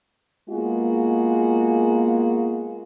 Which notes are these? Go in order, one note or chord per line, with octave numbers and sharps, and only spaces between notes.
G#3 A#3 B3 F4 F#4 G#4